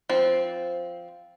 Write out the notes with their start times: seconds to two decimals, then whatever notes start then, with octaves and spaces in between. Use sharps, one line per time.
0.09 F3 C4